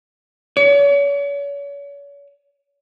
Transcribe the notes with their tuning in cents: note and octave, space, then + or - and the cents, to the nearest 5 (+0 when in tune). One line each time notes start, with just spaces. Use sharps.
C#5 +40